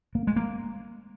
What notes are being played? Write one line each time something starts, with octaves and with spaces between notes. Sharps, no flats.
A#3
G#3
A#3